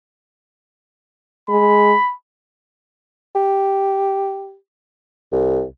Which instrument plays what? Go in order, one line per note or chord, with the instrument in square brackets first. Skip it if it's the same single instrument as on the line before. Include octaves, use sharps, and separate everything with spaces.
[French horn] G#3 [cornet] B5
[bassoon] G4
C2